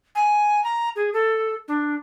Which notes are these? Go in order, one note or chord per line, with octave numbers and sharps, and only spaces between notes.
G#5
A#5
G#4
A4
D4